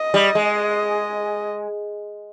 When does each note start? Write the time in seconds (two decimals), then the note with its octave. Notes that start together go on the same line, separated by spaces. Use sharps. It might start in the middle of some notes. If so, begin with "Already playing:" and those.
Already playing: D#5
0.14 G3
0.35 G#3